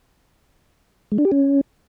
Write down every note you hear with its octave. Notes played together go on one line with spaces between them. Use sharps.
G#3
D4
G4
C#4